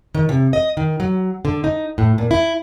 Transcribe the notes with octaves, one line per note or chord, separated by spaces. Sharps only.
D#3
C3
D#5
D#3
F#3
D3
D#4
A2
A#2
E4